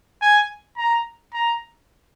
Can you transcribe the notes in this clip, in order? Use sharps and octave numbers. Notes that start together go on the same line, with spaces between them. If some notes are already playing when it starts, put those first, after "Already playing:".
G#5
A#5
A#5